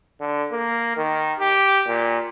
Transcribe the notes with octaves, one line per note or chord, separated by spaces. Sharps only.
D3
A#3
D#3
G4
A#2